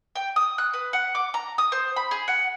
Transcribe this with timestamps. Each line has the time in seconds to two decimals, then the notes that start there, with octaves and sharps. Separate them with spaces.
0.15 G5
0.36 D#6
0.58 F#6
0.74 B4
0.93 F#5
1.15 D6
1.34 A#5
1.58 D#6
1.72 C5
1.96 B5
2.11 G#4
2.28 F#5